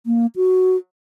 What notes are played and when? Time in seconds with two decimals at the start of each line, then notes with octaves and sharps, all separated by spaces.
0.06 A#3
0.36 F#4